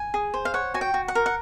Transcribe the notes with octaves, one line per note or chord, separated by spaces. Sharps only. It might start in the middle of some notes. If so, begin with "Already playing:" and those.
Already playing: G#5
G#4
C5
F5
C#5 F#5
F#4 G#5
G5
F#4
F#5
A#4
F#5